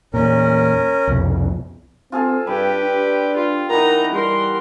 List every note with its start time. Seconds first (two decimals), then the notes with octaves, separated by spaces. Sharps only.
0.14 E2 A#2 C#4 A#4
1.07 C2 F2 B2
2.12 C4 F4 G#4 A4
2.47 G2 G3 G4 B4
2.84 D4
3.36 F4
3.70 E3 B3 D#4 A#4 A#5
4.13 G3 A#4 C6